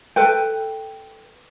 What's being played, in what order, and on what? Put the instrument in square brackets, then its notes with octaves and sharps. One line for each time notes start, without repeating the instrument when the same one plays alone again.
[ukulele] A4 B4 G5